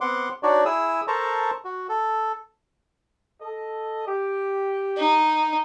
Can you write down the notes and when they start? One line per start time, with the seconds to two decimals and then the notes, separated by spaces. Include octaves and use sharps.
0.01 B3 C4 F#5 C6 D6
0.43 D4 D#4 F#4 C#5 D5
0.65 E4 G#4 D#6 E6
1.08 A4 A#4 C5 A5 A#5 C#6
1.64 F#4
1.89 A4
3.41 A4 D#5
4.08 G4
4.97 D#4